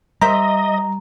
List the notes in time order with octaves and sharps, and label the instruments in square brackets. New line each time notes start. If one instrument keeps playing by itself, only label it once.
[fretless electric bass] G3 [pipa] A#4 C5 E5 [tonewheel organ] D#5 [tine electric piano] A#5